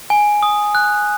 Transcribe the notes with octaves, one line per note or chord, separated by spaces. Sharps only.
G#5
D#6
F#6